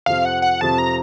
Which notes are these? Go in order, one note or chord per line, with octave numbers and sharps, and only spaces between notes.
F2 C3 F3 F5
F#5
F#5
F2 C3 F3 A5
A#5